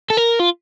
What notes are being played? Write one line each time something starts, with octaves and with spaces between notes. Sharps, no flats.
A4
A#4
F4